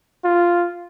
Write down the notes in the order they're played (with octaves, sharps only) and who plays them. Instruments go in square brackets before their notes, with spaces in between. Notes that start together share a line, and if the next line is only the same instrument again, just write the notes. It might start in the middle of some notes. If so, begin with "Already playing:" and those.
[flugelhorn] F4